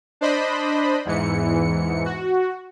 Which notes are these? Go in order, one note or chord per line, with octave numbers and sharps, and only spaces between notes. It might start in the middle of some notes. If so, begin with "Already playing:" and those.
D4 C5 D#5 B5
E2 G#2 E3 C#7
F#4